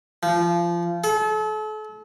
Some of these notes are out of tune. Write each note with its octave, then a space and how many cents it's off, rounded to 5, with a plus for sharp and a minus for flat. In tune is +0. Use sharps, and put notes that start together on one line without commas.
F3 -25
A4 -40